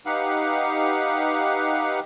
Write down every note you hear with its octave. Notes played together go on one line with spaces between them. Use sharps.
D#4 G4 B4 F5 F#5